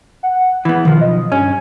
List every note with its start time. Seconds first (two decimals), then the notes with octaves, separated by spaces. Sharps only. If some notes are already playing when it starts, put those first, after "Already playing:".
0.23 F#5
0.65 E3 B3
0.85 B1 D#3 F3
1.01 D#5
1.32 G2 C#4